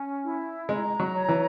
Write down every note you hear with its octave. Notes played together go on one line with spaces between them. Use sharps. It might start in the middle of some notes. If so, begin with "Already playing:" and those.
Already playing: C#4
E4
G#3 A#5
F#3
C#5
E3